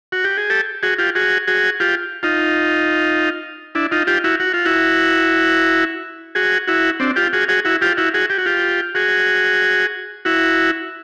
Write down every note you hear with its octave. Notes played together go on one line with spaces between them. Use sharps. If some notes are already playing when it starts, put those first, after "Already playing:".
F#4
G4
G#4
G4 A4
F#4 G#4
F4 G4
F#4 G#4
F#4 G#4
F4 G4
D#4 F4
D4 E4
D#4 F4
F4 G4
E4 F#4
F#4
F4
E4 F#4
F#4 G#4
E4 F#4
C4 D4
F4 G4
F#4 G#4
F#4 G#4
E4 F#4
F4 G4
E4 F#4
F#4 G#4
G4
F#4
F4 G4
F#4 G#4
E4 F#4